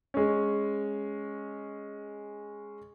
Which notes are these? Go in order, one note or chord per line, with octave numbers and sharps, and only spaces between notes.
G#3 C#4